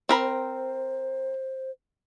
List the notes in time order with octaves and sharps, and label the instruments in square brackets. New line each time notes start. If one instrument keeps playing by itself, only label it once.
[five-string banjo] C4 A#4 B5 [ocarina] C5